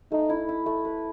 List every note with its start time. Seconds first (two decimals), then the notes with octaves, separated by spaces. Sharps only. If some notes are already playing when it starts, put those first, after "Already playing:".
0.12 A3 D#4
0.30 E4
0.49 E4
0.66 A3
0.85 B4